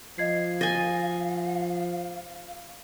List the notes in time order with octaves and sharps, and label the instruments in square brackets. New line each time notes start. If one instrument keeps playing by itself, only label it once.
[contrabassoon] F3 [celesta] D#5 G#6 C7 [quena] F5
[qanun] D#5 G#5 [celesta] A6